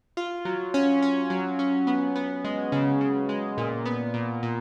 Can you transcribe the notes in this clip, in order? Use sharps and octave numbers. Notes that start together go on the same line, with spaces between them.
F4
F#3
C#4
C#4
F#3
C#4
B3
B3
G#3
C#3
C#3
G#3
A#2
B3
A#2
A#2